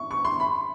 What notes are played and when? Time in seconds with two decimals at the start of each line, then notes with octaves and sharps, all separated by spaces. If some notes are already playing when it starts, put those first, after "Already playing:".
Already playing: C#6
0.11 C#6
0.25 C6
0.40 B5